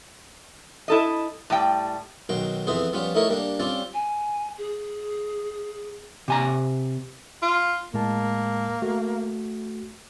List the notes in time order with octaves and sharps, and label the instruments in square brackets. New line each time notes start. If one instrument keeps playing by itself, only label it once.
[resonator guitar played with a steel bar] E4 A4 D#5
A2 G3 G5
[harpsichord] B1 D#3 F#3 G5 C6
F2 E3 B3 G#4 C5
F3 G3 B3 C#4 F4
A3 D#4 E4 A#4 C#5
G3 A#3 D4
G3 C4 C#4 F4 D5
[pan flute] G#5
G#4
[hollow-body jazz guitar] C3 G#5 A#5
[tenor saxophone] F4
[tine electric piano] A2 G#3 A5 [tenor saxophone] A#3
[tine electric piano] A3 F#4